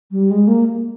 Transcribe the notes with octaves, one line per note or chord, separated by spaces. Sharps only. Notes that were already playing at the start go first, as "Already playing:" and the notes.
G3
G#3
A#3